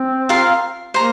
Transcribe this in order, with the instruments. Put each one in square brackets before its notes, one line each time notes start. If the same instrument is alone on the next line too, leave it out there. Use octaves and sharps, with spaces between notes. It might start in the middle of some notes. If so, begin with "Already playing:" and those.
Already playing: [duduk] C4
[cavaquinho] F4 A#4 F5
[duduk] A#3 [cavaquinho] C5 A#5